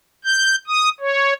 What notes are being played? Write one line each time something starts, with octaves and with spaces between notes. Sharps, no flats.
G6
D#6
C#5